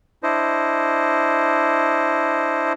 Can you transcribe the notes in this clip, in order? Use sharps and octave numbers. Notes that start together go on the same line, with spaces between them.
D4 E4 C5 D#5